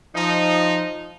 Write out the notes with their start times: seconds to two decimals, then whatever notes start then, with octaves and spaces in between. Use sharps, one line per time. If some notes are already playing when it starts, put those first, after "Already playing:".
0.14 F3 D#4